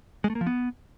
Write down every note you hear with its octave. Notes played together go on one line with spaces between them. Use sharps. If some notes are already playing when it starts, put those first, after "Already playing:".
G#3
A3
A#3
F3
B3